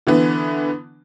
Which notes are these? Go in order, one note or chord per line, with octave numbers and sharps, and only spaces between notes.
D3 E3 B3